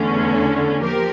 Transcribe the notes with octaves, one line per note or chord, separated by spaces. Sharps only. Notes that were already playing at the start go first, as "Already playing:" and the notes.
Already playing: E2 D3 A3 C#4
A4
F3 A#3 G4 A#4